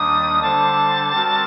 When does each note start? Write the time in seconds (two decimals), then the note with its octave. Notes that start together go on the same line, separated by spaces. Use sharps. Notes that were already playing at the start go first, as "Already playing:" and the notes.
Already playing: D#2 D#3 G3 D4 D#6
0.41 D3 G3 D4 A4 C5 A5
1.12 G3 C4 F#4 A#4